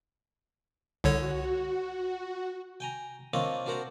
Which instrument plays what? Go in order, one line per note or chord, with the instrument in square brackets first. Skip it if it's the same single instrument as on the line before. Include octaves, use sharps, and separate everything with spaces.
[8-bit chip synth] C2 D3 C#5 [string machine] F#4
[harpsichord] G5 G#5 A#5
A#3 C4 D4 F4 C#5 D#5
D4 F#4 A#4 C5 F#5 A#5